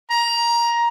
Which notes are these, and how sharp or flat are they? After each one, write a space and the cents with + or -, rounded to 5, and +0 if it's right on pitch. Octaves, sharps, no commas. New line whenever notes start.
A#5 +15